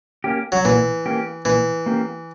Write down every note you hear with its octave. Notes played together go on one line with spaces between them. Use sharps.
A#3 C#4 G4
F#3
A#2 E3
A#3 C#4 G4
A#2 E3
A#3 C#4 G4